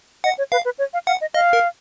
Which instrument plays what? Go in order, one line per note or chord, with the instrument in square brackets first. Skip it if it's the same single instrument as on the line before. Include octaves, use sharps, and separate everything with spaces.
[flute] D#5 [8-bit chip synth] F#5
[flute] C#5
[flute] B4 [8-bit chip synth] F5
[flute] B4
C#5
F5
[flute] F5 [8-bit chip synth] F#5
[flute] D#5
[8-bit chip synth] D#5 [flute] F5
[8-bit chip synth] A#4